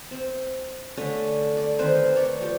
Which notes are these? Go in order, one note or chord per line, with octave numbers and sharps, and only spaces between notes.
C4
D3 A3 C#4
D5
D#3 C4 B4 C5
A3 C#5 D5
F3 G4